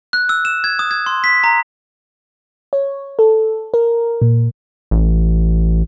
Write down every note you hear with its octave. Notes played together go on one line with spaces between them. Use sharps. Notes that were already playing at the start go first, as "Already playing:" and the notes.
F#6
E6
E7
G#6
D#6
G#6
C6
B6
A#5
C#5
A4
A#4
A#2
A1